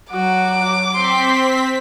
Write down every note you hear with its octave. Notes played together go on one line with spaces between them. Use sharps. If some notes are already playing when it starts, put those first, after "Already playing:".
F#3 F#4 D6
C4 C6 B6